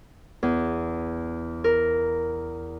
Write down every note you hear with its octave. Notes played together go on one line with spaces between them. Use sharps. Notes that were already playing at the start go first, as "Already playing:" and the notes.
E2
A#4